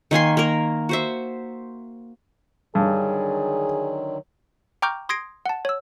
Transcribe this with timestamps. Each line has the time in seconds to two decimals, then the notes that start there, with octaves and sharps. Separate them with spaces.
0.11 D#3 A#3 G#5 C6
0.37 A#3 A#4
0.89 F#4 C5 E5
2.75 G2 D3 D#3 F#3 G#4
4.82 G5 A#5 C#6 D6 F6 G6
5.09 C6 D#6 G#6 A#6 C7 D7
5.46 F#5 A5
5.65 C#5 E6